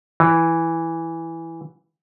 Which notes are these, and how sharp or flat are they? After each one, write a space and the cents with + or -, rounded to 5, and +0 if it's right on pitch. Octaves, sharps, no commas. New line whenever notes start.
E3 +0